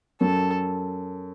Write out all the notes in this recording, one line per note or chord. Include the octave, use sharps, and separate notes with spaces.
F#2 A4